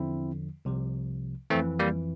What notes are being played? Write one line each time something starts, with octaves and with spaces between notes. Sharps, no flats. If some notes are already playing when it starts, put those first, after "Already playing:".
Already playing: E2 D3 F3 C4 E4
C2 C3 F3
F2 E3 A3 C4
G3 A#3